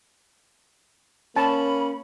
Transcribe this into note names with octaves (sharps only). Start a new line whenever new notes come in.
A#3 C#4 A5 B5